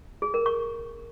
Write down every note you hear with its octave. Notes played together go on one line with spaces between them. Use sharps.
G#4
A#4
C#6